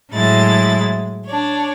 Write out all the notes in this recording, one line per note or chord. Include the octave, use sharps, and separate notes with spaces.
A2 F#3 G#3 E4 A6
D4 C#5